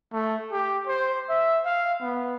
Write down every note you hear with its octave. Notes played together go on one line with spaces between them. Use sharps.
A3
G4
C5
E5
F5
B3